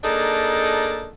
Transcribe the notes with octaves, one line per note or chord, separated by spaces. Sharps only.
A#3 D4 D#4 G#4 A4